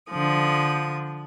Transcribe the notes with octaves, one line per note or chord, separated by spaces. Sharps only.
D3 F3 D#6